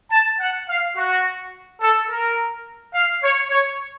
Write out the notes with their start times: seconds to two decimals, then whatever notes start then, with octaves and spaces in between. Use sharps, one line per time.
0.12 A5
0.40 F#5
0.70 F5
0.97 F#4
1.82 A4
2.10 A#4
2.95 F5
3.24 C#5
3.51 C#5